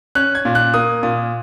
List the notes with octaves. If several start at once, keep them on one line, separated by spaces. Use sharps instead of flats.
C#4 F#6
G#6
A#2
F#6
A#3 D#6
A#2 D#6